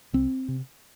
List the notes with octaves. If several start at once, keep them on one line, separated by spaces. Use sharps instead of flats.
C2 C4
C3